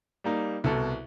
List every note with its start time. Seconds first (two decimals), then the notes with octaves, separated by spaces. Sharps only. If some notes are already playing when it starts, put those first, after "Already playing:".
0.24 G3 A#3 D#4
0.64 C2 B2 A4